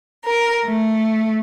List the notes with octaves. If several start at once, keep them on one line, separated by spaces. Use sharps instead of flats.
A#4
A3